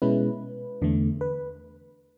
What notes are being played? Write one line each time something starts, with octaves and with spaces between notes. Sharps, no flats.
B2 G#3 C#4 E4 B4
E2 D3 A3
B4